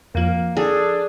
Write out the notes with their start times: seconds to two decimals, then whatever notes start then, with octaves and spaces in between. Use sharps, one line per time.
0.15 F2 F3 A#3
0.57 D4 G#4 A4